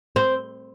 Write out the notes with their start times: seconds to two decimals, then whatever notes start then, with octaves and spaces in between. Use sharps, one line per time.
0.16 C4